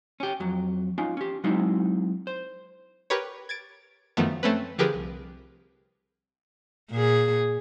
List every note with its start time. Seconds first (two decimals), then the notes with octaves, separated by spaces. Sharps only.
0.20 C#4 G4
0.40 F2 F#3
0.98 C#4 D#4 F4
1.17 C#4 G4
1.44 F#3 G#3 C4 D#4 E4
2.27 C5
3.10 G4 A#4 B4 C#5
3.49 G#6 A6 D7
4.17 F#2 D#3 F3 A3 B3
4.43 A3 C4 C#4 B4
4.78 D3 F3 G4 G#4 A#4 B4
4.94 C2
6.91 A#2 G#4